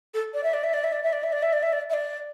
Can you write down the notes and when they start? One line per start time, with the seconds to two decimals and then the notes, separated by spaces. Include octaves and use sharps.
0.14 A4
0.34 D5
0.43 E5
0.53 D5
0.63 E5
0.73 D5
0.84 E5
0.92 D5
1.03 E5
1.12 D5
1.23 E5
1.32 D5
1.42 E5
1.53 D5
1.63 E5
1.72 D5
1.90 E5
1.93 D5